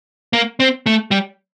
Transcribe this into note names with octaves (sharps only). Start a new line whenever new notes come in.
A#3
C4
A3
G3